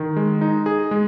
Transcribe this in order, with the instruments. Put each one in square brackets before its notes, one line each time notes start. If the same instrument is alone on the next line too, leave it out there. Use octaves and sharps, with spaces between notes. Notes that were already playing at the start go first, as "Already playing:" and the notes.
Already playing: [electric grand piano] D#3
G#3
D#4
G#4
G#3